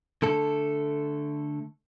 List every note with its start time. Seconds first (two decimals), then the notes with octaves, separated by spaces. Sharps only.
0.22 D3 A3 A4